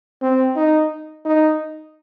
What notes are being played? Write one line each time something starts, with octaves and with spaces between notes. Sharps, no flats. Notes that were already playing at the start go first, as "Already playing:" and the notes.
C4
D#4
D#4